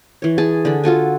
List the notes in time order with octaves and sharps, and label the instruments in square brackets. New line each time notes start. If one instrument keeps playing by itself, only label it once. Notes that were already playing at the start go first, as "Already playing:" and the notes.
[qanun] E3 C#5
G#4 G#5 A5
D3 D4 B5
F4 F#4 A4 G#5